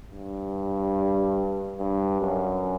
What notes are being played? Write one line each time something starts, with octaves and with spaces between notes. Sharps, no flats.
G2
G2
F#2